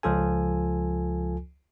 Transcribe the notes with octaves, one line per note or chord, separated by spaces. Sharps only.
C#2 F3 F4 A4 G#5